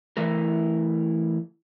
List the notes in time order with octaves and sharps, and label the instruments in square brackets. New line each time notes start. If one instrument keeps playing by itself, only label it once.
[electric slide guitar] E3 A3 E4 A#4